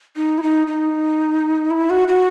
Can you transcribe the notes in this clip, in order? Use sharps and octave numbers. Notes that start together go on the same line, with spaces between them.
D#4
E4
D#4
D#4
E4
F#4
F#4